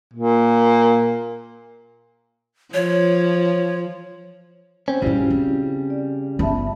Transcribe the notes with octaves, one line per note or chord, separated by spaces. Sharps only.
A#2
F3 C#5
C4 C#4 C5
A#1 G2 C#3 G3 C#4 E4 F#4
C4
D5
G1 B3 E5 A5 B5